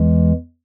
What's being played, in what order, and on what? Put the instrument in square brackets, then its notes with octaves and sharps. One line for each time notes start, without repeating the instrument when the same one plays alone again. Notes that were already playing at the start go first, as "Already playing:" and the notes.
Already playing: [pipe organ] E2 E3 G#3